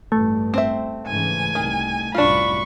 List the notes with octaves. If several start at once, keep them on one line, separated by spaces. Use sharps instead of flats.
A1 G2 A3
C4 C5 E5
G#2 C#3 E3 G#5
C2 D#3
C2 F#2 A2 D4 F4 B5 C#6